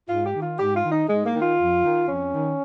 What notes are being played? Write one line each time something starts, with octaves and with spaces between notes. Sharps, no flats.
G#2 F4
G4
D#3
F4
G#2 G4
F4
D#3
D#4
G#2 G#3
A#3
D#3
F4
F2
D#3
F2 C#4
D#3